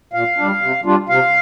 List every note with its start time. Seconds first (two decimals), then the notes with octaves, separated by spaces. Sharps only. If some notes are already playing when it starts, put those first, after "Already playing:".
0.13 A#2 F5
0.38 G3 D4
0.62 C3
0.85 G3 D4 F4
1.09 C3 F5